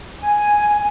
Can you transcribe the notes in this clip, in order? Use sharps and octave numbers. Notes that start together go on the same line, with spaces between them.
G#5